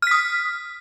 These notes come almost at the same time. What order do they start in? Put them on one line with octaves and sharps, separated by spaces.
F6 B6 D#6